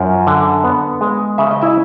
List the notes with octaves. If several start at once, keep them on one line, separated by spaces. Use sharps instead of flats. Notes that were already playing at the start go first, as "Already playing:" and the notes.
Already playing: F#2 F3
D3
B3
G#3
C#3 E5
D#5
E4 E5